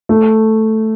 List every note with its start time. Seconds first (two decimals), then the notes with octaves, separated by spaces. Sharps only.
0.09 A3